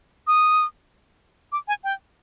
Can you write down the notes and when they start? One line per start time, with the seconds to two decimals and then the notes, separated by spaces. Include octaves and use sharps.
0.27 D#6
1.52 D6
1.68 G#5
1.84 G5